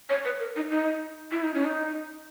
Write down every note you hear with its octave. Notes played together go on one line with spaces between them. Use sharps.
C#5
B4
A#4
D#4
D#4
E4
D#4
C#4
D#4